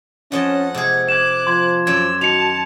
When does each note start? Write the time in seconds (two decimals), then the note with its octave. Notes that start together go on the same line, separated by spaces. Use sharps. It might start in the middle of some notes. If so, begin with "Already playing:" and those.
0.32 F2 C#4 D#5 F#5 A5
0.74 C3 G#3 G#4
1.09 D6 F#6 G#6 E7
1.47 F3 C6 G#6
1.87 F#2 D5 E6 G#6
2.21 D#3 F#4 A5 C#7 F7